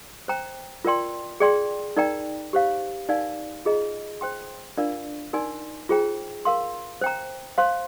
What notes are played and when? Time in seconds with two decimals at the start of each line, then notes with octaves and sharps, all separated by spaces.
0.28 C5 G5 A#5
0.85 F4 A#4 D5 G5 C6
1.40 G#4 D5 G5 C6
1.97 D#4 A#4 D5 G5 A#5
2.53 G4 C5 F5
3.09 D#4 A#4 D5 F5 G#5
3.65 F4 G#4 D#5 A#5
4.21 C5 G5 C6
4.77 D4 F4 A#4 D5 F5
5.33 D#4 A#4 D5 G#5 C6
5.89 F4 G#4 C5 G5 A#5
6.45 A#4 F5 C6
7.01 C5 G5 A#5
7.58 C5 F5 C6